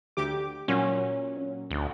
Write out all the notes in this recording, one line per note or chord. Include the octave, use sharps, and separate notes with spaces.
D2 G4 D6
A#2 F#3 C#4
D2